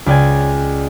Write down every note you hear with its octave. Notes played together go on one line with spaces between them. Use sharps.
C#2 D5 G5 G#5